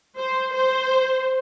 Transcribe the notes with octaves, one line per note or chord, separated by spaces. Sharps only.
C5
C5